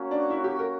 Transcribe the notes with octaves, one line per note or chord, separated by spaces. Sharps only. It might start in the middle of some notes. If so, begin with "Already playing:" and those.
Already playing: A#3 C#4 F#4 C#5
D4
E4
G4
A#4